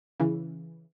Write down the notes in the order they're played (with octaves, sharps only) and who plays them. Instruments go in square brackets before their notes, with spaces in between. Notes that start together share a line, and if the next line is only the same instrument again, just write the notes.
[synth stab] C#3 E3